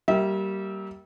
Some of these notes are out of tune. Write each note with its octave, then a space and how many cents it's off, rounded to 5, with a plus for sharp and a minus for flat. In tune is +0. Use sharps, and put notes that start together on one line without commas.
G3 -20 A#3 -5 E5 -30